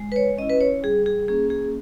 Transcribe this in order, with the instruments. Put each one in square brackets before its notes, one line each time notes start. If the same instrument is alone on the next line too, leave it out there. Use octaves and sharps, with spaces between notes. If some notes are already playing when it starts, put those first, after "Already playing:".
Already playing: [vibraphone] G#3
B4
C#5
C#4 E4 D#5
B4
C#5
G3 G#4
G#4
A#3 C#4 G#4
G#4